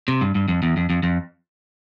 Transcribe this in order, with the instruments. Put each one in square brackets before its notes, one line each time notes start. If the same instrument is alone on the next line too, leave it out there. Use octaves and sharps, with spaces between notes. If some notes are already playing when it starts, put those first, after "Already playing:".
[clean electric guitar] C3
G2
G2
F2
E2
F2
F2
F2